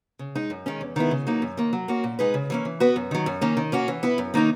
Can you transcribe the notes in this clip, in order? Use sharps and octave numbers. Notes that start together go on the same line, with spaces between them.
C#3
G#3 D#4
F#2
D#3 G#3 C#4
E2
D#3 G#3 B3 E4
C#3
F#3 A#3 D#4
F#2
D#3 A#3
F#3
A#3 C#4 F#4
A#2
G#3 D#4 G#4 B4
C#3
E3 A#3 C#4
E3
B3 F#4 B4
F#2
D#3 F#3
F#2
D#3 A#3 C#4
D#3
A#3 C#4 F#4
E3
B3 E4 B4
F#2
D#3 A#3 D#4